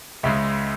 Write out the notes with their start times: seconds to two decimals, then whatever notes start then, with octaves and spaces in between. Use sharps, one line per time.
0.23 C#2 C#3 G#3 E5